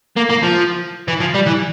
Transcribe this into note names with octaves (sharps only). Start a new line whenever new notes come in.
A#3
A#3
F3
E3
F3
G3
E3